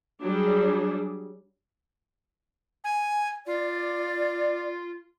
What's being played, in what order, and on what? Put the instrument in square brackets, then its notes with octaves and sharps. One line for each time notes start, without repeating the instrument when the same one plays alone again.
[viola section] F#3 G3 D4 G#4
[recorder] G#5
[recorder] F4 [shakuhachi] D5